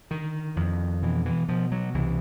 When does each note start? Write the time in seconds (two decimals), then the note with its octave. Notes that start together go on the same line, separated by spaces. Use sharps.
0.10 D3 D#3
0.56 F2
1.02 B2 E3
1.26 E3
1.49 B2 F3
1.72 F#3
1.94 C2 E3